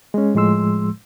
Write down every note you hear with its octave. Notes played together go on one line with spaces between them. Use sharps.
G#3 C#4
A2 F3 G#3 C6 E6